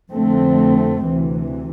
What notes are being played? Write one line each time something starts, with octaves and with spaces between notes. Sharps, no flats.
F2 D3 A3 C4
D2 C3 E3